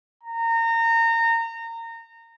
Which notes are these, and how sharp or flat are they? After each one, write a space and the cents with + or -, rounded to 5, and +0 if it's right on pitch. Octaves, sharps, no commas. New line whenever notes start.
A#5 -25